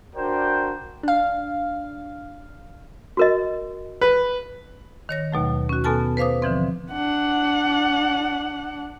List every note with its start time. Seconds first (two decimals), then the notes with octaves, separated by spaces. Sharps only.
0.15 D4 F#4 A#4 C5 D5 G5
1.03 D4 F5
3.17 F#4 A#4 D#5
4.01 B4
5.09 D#3 C#5 A#6
5.32 D#2 B2 F#3 A3
5.69 C#4 F#4
5.84 B2 B3 A4 G#5 A5 F6
6.17 B4 C5 F5 D6 D#6
6.42 D3 E3 F3 C4
6.93 D4 F#5